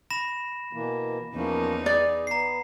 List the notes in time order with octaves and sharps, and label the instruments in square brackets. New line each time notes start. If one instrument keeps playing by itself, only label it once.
[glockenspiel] B5 A#6 E7
[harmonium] B2 E3 A#3
[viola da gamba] E2 D#4 [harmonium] F3 A#3 C#4
[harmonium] G#4 [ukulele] D5
[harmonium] B3 [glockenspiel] A#5 C7